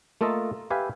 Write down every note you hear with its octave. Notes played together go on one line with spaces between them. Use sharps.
A3 A#3 F4 A4 D#5
G4 B4 E5 F5 G#5